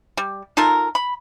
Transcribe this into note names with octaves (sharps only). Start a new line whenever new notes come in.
G3
D#4 F4 A4 A#4
B5